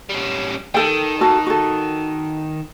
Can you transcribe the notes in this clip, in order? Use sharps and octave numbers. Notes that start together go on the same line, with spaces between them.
G3 C#4
D#3 A4 G5
F#4 A4 A5
F#4 A4